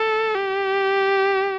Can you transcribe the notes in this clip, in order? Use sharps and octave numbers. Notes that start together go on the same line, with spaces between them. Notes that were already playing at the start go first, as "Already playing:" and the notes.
Already playing: A4
G4